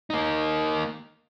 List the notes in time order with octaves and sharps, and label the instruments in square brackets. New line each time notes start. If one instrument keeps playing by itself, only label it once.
[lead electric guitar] A#3 D#4